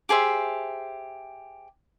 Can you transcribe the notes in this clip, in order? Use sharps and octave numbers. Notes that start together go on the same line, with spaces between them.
G4 G#4 C5 E5